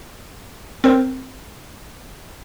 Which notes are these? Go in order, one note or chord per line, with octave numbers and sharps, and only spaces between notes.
C4 A#4 C5